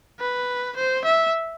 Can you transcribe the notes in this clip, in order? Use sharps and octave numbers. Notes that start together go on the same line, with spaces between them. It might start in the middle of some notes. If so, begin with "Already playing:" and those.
B4
C5
E5